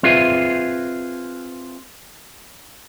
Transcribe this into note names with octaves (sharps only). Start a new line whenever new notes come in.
C4 F4 G#4 B4 E5